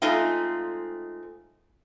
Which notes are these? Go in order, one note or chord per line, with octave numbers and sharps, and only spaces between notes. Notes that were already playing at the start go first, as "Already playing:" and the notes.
G#3 A3 C4 D#4 F4